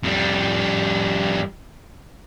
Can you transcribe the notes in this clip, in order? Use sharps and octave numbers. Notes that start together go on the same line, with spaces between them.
F2 G3